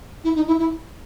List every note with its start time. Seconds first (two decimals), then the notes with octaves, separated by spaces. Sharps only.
0.24 E4
0.35 D#4
0.47 E4
0.59 E4